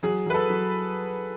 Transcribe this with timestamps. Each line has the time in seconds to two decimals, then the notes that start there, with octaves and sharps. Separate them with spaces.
0.03 F#3 G#4
0.26 F#3 B4
0.34 A4
0.50 F#3